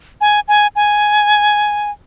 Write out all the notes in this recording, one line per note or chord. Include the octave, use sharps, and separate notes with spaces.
G#5
G#5
G#5